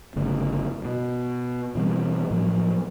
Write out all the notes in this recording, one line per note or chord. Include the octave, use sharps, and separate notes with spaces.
G1 C#3 A3
B2
B2 E3 G3 C4
A2 F3 F#3